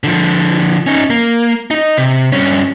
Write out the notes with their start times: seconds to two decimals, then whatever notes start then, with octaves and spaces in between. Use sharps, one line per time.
0.04 D3 F3
0.87 C#4 D#4
1.10 A#3
1.71 D#4 D#5
1.97 C3
2.32 G2 C#4